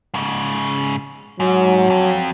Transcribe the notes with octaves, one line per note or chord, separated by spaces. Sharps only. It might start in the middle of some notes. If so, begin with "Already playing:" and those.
G#2 C#3
G#2 F#3
F2